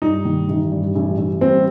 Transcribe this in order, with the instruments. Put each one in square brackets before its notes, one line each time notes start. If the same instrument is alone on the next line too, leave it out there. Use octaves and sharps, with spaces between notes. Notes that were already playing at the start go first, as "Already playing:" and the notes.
[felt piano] G2 [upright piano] D#4
[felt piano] D#3
A1
G2
A1
A1
[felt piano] G3 [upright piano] C4